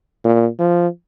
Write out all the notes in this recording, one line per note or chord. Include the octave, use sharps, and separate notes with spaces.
A#2
F3